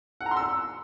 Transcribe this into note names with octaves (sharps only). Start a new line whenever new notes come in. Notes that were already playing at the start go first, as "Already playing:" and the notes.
F#5
A#5
C6
E6